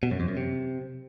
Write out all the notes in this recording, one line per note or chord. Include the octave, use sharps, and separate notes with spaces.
B2
F#2
F2
F#2
C3